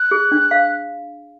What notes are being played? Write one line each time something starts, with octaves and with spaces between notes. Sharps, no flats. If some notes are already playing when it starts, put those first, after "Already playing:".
Already playing: F#6
G#4
D4
F5